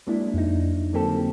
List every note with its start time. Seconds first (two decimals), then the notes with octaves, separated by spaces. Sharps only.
0.07 F#3 G#3 A#3 D4 E4
0.34 F2 D#4
0.93 D3 F#3 A#3 C4 G4 A4